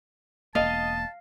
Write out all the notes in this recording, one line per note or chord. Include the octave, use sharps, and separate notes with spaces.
E1 A#3 D#5 F5 A5